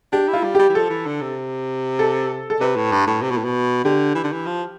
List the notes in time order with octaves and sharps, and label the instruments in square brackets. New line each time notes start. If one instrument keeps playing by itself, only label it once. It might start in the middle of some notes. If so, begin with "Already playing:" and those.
[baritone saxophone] D4 [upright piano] G4
[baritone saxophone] E4
[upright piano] F4
[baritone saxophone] G3
[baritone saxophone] G3 [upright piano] G4
[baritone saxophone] E3
[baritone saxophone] F3 [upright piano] A4
[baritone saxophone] E3
D3
C3
[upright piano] A4
A4
[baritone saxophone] C3 [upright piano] B4
[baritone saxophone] A2
G2
A2
C3
B2
A2
B2
[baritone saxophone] D3 [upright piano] G4
[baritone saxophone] E3
D3
E3
F3